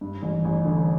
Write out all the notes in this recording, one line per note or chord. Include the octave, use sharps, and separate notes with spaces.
G2
A1
A1
D3